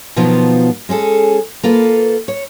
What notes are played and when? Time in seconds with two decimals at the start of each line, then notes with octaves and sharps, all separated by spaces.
0.16 B2 D#3 F3 F#3 B3 F4
0.89 G#3 C#4 G#4 A4
1.63 A#3 F4 A4 B4
2.28 C#5